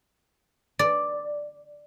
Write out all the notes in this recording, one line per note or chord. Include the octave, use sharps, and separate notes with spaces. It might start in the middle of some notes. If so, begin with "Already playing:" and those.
D5